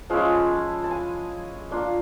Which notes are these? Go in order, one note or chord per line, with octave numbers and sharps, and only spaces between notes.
F3 G#3 C#4 E4 F5
A5
A5
G#5
A#3 D4 F4